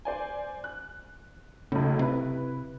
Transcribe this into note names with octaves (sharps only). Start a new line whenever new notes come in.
C5 D5 G#5
F#6
B1 A2 C#3
C3 E4 B4